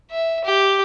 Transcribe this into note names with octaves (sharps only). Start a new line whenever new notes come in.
E5
G4